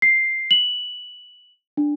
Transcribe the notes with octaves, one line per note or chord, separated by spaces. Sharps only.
C7
F#7
D4